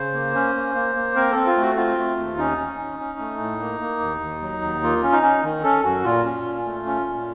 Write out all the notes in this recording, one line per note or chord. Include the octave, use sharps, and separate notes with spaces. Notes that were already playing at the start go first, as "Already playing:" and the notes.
Already playing: C#3 C5
A#3
C#4
A#3
A#3
A#3
C4 A#4
C4 A4
F4
A3
F#4
C4 F4
A3
D#2
C#4 D#4
C#4
C#4
C#4
A3
A2
A#3
A#3
D#2
D#2
F#3
D#2
A#3 F4
C#4
D#4
C#4
D#3
C#4 A4
F#2 F#4
A#2 F4
C#4
A#2
A3
C#4
A#2